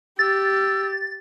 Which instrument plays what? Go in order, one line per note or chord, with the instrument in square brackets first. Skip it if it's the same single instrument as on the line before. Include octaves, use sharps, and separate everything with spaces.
[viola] G4 [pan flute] E6 [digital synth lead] A6